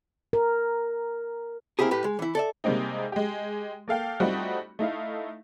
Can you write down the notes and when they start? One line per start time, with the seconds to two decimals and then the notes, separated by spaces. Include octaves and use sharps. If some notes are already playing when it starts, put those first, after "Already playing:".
0.33 A#4
1.79 A#3 C4 E4 G4 G#4
1.91 A2 G4 B4
2.04 G#3
2.19 E3 E4
2.35 A4 D5 E5
2.64 C3 G3 G#3 A#3 C4 D#4
3.12 G#3 G4
3.88 A#3 A4 F5 G5
4.20 G3 A3 C4 D#4 F4 F#4
4.79 A3 D#4 E4 F5